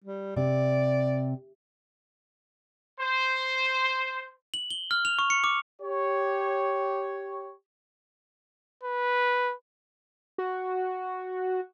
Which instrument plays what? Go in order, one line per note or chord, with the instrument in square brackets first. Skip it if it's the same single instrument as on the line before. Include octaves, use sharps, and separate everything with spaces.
[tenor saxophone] G3
[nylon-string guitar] C3 [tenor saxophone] D5
[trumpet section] C5
[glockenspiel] F#7
G7
F6
F7
C#6
C#7
D6
[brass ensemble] G4 C#5
[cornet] B4
[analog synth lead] F#4